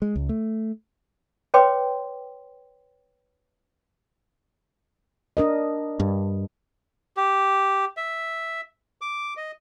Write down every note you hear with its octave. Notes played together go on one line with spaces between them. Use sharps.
G#3
C#2
A3
B4 C#5 G5 C6 D6
D4 A#4 D#5
G2
G4
E5
D6
D#5